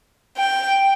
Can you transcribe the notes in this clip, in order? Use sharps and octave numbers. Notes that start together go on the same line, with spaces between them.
G5